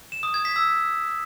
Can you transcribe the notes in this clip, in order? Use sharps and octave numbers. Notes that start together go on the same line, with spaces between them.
E7
D#6
G#6
B6
E6